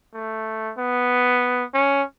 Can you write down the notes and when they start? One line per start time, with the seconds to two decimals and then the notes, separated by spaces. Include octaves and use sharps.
0.14 A3
0.78 B3
1.74 C#4